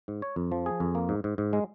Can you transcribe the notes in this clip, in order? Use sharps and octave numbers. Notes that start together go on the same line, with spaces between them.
G#2
C#5
F2
F3
G#4
F2
A#3
G#2
G#2
G#2
G#3